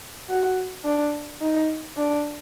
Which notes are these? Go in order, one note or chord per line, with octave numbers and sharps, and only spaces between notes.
F#4
D4
D#4
D4